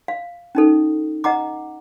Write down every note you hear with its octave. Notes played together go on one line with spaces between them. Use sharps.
F5
C#4 D#4 A4
D#5 F#5 A#5 D6